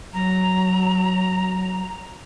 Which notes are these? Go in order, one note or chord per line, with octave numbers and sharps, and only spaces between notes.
F#3 A#5